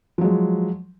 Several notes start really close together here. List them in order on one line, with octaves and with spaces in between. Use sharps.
F3 F#3 G#3